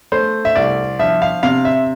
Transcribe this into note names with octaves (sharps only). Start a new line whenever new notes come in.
A3 C5
E5
C2 D5
F3 E5
F5
C3 F5
E5